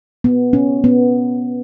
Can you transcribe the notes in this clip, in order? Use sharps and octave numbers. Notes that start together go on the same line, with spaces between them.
B3
C#4
B3